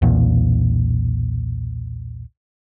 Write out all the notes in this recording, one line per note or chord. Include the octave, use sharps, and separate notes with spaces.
B1 E2 A#2